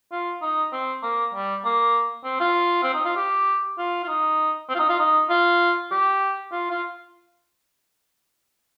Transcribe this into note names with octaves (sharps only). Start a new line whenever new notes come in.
F4
D#4
C4
A#3
G3
A#3
C4
F4
C4
D#4
F4
G4
F4
F4
D#4
C4
F4
D#4
F4
D#4
F4
G4
F4
F4